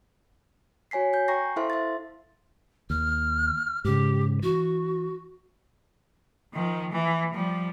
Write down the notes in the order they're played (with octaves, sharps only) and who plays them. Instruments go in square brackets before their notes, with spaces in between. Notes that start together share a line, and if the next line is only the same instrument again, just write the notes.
[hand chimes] F#4 C#5 G#5 B6 C7
G#5 G6
G5 A#5 C#6 A#6 C7
E4 A4 C5 E5 F5 C6
E5 A6
[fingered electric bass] D#2 [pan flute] F6
[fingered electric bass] G#2 C#3 [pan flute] G4
[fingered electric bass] E3 [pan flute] F#4
[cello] D#3 F3
E3
F3 G3